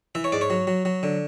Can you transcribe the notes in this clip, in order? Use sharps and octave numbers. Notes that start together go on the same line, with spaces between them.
E3 E5
C#5
G#2 D5
C#5
F#3
F#3
F#3
D3